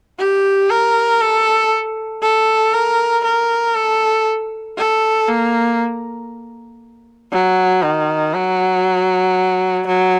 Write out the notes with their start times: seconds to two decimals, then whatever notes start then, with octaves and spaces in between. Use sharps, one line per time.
0.19 G4
0.70 A#4
1.21 A4
2.22 A4
2.74 A#4
3.24 A#4
3.75 A4
4.78 A4
5.28 A#3
7.32 F#3
7.83 D#3
8.33 F#3
9.87 F#3